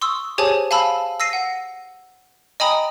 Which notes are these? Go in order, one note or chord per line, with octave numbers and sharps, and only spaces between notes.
C6 C#6 D#6 E6
G4 G#4 C5 C#5 G#5 A5
F5 G#5 A5 B5 E6
E6 A#6 C7 D#7
F#5
D#5 G5 G#5 A#5 B5 D#6